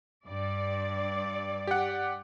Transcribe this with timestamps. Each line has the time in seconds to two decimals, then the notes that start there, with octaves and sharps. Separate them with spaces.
0.25 G2 D5
1.67 G4 F#5